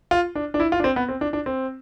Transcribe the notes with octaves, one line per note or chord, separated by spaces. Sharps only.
F4
D4
D4
E4
F4
D4
C4
B3
C4
D4
D4
C4